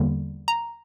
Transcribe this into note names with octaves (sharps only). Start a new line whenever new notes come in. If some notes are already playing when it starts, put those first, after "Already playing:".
Already playing: E2 D3 G3 A#3
A#5